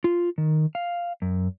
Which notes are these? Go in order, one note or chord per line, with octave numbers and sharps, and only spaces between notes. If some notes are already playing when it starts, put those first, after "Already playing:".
F4
D#3
F5
F#2